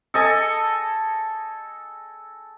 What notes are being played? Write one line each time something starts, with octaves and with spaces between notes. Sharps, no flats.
A4 D#5 G#5